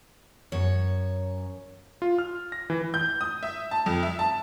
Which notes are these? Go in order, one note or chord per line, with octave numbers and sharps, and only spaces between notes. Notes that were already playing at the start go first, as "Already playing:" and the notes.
F#2 C#5
F4
F6
A#6
E3
G6
D#6
E5
A5
F2
E5
A5